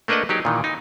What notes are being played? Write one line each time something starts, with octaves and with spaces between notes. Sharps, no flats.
A3 A#3 D4 B4 D#5 F#5
F#3 D#4 G4 G#4
A#2 D#3 E3
D#4